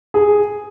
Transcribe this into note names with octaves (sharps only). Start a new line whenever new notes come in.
G#4